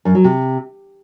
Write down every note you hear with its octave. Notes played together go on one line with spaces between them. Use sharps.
F#2
F#3
C3